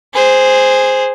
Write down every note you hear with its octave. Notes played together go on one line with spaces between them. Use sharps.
G#4 C5